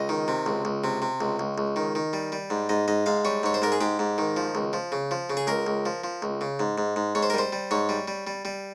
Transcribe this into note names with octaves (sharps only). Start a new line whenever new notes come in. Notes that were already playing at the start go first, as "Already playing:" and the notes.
Already playing: C#2 D#5
D#3
C3
C#2
C#2
C3
C3
C#2
C#2
C#2
D#3
D#3
G3
G3
G#2
G#2 D#5
G#2 D#5
G#2 F5
G3 C#5
G#2 C#5
C5
G#2 A#4
G#4
G#2 G4
G#2
D#3
F3
C#2
F3
C#3
F3
C#3
G#4
C#2 A#4
C#2
F3
F3
C#2
C#3
G#2
G#2
G#2
G#2 C#5
C5
A#4
G3 C5
G3
G#2 C#5
G3
G3
G3
G3